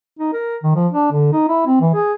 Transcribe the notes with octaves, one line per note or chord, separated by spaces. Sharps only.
D#4
A#4
D#3
F3
D4
D3
D#4
E4
C4
E3
G#4